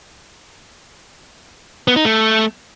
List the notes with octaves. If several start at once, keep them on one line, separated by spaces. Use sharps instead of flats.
B3
D#4
A3